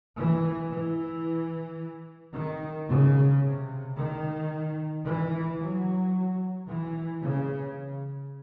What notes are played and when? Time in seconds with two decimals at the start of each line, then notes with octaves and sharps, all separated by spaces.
0.17 E3
0.71 E3
2.34 D#3
2.88 C#3
3.43 C3
3.96 D#3
5.05 E3
5.59 F#3
6.67 E3
7.22 C#3